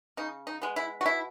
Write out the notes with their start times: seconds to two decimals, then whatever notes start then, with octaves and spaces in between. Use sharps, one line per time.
0.17 C#3 D#4
0.47 D#4
0.62 G#3 B3
0.76 E4
1.01 F#4
1.05 B2 E4